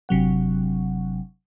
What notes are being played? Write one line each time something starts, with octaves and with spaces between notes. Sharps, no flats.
G1 C3 F#3 F#5